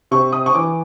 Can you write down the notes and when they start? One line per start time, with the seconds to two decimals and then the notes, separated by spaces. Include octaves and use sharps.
0.11 C3 C#6
0.33 D#6
0.46 C#6
0.54 E3 D6